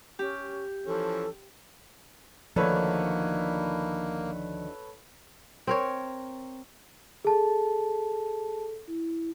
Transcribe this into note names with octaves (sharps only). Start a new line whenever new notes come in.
C#4 G4
E3 F3 C#4 A4
D2 D3 D#3 F3 A#3 A4 B4 C#5
C4 A#4 C#5
G#4 A4 A5
E4